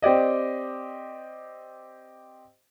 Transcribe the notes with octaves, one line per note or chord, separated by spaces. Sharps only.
C4 G4 D5 D#5